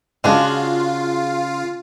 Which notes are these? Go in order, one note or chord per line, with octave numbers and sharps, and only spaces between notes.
C#3 G#3 D4 F4 F#4